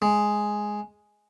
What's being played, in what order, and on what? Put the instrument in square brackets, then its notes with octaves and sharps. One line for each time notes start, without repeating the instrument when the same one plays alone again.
[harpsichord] G#3